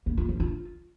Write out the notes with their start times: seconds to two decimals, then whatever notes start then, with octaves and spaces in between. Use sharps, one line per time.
0.06 A#3
0.17 F4
0.29 F3
0.40 F4